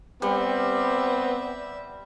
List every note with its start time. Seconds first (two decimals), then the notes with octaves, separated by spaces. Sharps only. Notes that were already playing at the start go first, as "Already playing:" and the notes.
0.22 G3 B3 C4 D5 E5